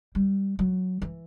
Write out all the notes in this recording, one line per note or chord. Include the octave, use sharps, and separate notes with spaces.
G3
F#3
E3